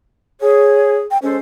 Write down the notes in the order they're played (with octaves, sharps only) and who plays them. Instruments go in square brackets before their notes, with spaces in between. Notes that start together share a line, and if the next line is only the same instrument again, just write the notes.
[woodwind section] G#4 [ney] C#5
[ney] G5
[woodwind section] G#3 A4 C5 [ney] C#4